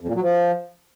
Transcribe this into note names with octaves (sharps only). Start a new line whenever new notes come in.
F2
A#2
F#3
F3